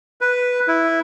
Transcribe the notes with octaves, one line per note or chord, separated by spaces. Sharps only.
B4
E4